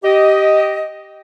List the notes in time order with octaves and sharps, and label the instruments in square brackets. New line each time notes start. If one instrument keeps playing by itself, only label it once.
[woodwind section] G4 D#5